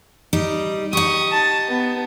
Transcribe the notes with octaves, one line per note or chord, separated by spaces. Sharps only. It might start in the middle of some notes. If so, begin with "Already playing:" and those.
G3 D#4
D#4 G4 C#6 D#6
A5
B3